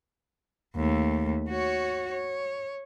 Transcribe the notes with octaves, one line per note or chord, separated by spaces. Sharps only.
D#2 A3
F#4 C#5
C#5